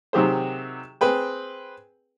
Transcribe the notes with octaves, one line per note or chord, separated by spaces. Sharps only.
C3 D#3 F#3 G4 G#4 C5
C4 G#4 B4 G5